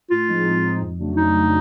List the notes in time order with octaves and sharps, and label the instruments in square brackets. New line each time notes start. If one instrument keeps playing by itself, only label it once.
[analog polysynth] A2 [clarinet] F4
[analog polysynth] F3 G#3 C4 D#4
A2
F3 G#3 C4 D#4
F2
C#3 F#3 A3 D4
[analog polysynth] F2 [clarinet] D#4
[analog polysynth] C#3 F#3 A3 D4